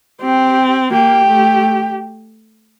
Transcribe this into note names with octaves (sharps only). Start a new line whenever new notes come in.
C4 G4
A#3 G4
A3